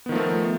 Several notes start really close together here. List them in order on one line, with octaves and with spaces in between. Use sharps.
B3 D#3 F3 A3